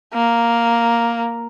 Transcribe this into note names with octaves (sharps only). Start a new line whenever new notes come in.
A#3